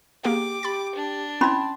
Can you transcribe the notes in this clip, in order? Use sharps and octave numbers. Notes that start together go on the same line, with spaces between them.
A#3 G4 G#4 F#5 D6
G4 B5 A6
D4
C4 C#4 E4 A5 B5 C6 G#6